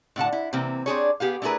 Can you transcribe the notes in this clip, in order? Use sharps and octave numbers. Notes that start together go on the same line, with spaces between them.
A2 D3 F#5 A5
E4
C3 E3 A#3 C4
C4 D4 G#4 C#5
B3 G4 G#4 F5
A3 D4 E4 G#4 A#4 B4